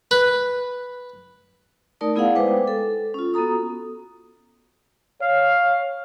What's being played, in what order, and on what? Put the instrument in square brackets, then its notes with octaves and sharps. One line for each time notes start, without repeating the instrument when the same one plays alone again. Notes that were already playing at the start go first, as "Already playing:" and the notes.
[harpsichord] B4
[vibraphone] A3 D#4 A#4 D5 A5 D#6
B3 E4 G#4 D5 F5 F#5
G#3 B4 C5 G5 D6
A4
C#4 F4
B3 F#4 A4 A#5 D#6
[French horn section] C#5 [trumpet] F5